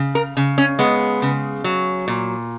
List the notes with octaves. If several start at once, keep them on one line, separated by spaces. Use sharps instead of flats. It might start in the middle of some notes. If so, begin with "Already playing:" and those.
Already playing: C#3
A#4
C#3
C#4
G#3 B3
C#3
F#3
A#2